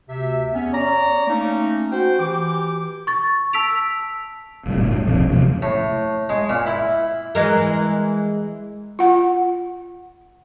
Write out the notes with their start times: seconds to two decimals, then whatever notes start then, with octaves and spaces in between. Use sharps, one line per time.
0.09 D2 C3 E5
0.53 E2 B3 C#4
0.72 C#5 D5 A#5
1.27 A3 A#3 C#4 D#4
1.91 F#4 C5 G5
2.19 E3 G4 D6
3.07 C#6 A6
3.53 A5 E6 B6 D7 F7
4.66 F1 D2 A2 G3
4.77 G2 A#2
5.05 D1 B1 F2 C#3
5.32 C3 F3 F#3 A#3
5.62 A2
6.29 G#3
6.49 A#2
6.67 E4
7.35 E3 G#3 A#4
8.99 F4 F#5